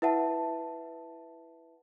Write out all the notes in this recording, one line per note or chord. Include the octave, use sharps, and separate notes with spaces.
E4 B4 E5 F#5 A5